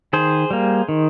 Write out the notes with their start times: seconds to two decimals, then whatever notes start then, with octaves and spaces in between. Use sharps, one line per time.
0.13 D#3 G#4 C5
0.51 G3 A#3
0.89 D#3